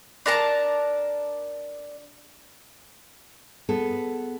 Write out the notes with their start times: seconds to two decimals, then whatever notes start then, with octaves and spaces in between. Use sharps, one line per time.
0.26 D4 A#4 A5 A#5
3.69 B3 G#4 A4